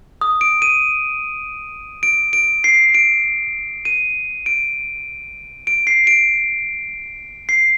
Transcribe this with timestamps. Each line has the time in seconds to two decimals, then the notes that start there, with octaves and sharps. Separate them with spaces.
0.21 D#6
0.41 D7
0.62 D#7
2.03 D7
2.33 D7
2.64 C7
2.94 D7
3.85 D#7
4.46 D7
5.67 D7
5.87 C7
6.07 D7
7.49 C7